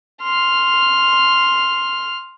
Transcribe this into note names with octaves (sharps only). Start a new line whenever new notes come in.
C6 F6